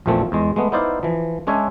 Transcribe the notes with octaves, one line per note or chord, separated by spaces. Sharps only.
A#1 E2 A#2 F3 A3 C4
E2 G#3
G#3 A3 B3
B3 D#4 E4 C5 D5 F5
E3 F3
G#3 C#4 D4 C#5 E5 G#5